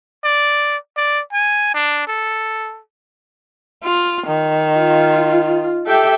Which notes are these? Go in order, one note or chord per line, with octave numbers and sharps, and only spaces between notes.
D5
D5
G#5
D4
A4
F4
D#3
F4
G4 A4 E5 G5